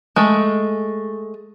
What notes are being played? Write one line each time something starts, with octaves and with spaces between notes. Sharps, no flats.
G#3 A3